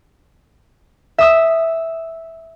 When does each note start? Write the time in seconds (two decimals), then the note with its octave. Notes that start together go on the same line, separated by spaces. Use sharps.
1.18 E5 D#6 E6